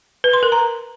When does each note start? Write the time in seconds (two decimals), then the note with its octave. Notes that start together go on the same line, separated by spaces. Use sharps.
0.24 B4
0.33 C6
0.43 A#4
0.52 A#5